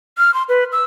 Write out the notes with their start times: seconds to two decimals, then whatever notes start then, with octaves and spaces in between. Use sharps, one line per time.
0.18 F6
0.34 C6
0.49 B4
0.72 E6